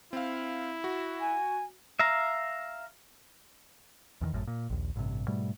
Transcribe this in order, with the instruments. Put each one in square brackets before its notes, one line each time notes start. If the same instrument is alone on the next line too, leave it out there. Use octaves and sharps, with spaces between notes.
[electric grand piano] C4 F5 [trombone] E4
[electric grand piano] F#4
[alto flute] G#5
[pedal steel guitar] E5 F5 A#5
[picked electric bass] E2 B2 D#3
G#1 F#2 A2
A#2
A#1 D#2
A1 G2 C3
G#2 B2 G3 A3